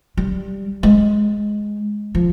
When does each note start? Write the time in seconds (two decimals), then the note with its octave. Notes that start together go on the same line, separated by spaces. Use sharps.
0.17 G3
0.83 G#3
2.15 F3